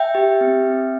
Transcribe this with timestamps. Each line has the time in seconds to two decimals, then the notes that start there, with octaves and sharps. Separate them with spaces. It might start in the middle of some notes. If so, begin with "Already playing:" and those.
Already playing: E5 G5
0.15 G4
0.41 C4
0.67 C4